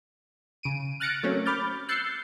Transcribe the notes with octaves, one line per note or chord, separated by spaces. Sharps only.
C#3 D7 D#7
F6 F#6 A6 A#6 C#7 D7
F#3 A3 A#3 C4 C#4
B5 D6 F6 G6 A6
E6 F#6 G6 A6 C7 C#7